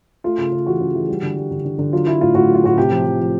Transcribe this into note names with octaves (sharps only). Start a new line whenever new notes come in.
A3 F4
C#3
C#3
E3 F#4
C#3
E3
G3
D3
G3
D3
D3
D3
F#3 F4
F#3 E4
A2 F4
A2 F#4
F#3
F4
A2 F#4
C3 G4
F3
F3
F3